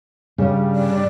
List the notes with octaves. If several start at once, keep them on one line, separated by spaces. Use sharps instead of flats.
G2 C#3 G3
D5